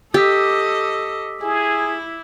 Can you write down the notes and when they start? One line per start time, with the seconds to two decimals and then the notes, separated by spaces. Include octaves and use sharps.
0.14 G4 A4 D#5 D6 E6 B6
1.41 E4 G#4